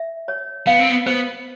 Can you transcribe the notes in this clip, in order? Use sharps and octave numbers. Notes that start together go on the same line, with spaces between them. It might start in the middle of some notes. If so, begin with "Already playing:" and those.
Already playing: E5
C#5
B3 F5
C4
B3
B3 C5